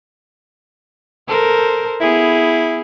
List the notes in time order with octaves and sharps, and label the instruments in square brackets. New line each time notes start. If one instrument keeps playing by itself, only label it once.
[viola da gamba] A4 A#4 C5
[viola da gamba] B3 G#4 [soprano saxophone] E4